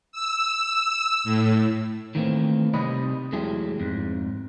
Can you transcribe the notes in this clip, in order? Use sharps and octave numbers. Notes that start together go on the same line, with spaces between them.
E6
A2
D#3 E3 A3 A#3 C4
C3 G3 D#4 D#5 B5
E2 F#3 G#3 A3 E4 G4
F2 G#2